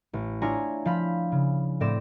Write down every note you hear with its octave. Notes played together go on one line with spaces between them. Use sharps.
A1
D4 E4 F4 C#5 G#5 A#5
F3 F5 B5 B6
C#3
A2 C4 D5 A#6 E7